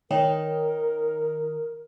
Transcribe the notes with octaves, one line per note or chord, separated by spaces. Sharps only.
D#3 D#4 A#4 C#5 G5